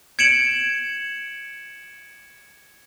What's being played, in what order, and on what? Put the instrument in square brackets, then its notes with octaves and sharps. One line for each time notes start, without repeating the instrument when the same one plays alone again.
[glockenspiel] G#6 C#7 D7 E7 F#7